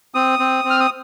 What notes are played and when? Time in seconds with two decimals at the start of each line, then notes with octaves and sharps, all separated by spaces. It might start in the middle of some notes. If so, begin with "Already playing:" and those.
0.14 C4 D#6
0.39 C4
0.65 C4
0.70 F6
0.80 D#6